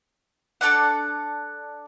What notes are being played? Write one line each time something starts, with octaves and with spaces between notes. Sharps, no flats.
D4 A4 D5 F#5